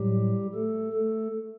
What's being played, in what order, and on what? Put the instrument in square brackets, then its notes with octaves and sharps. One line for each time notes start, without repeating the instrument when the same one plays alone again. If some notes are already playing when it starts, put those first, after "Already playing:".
Already playing: [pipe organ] A2 F#3 G3 G4
A3 A4
A3 A4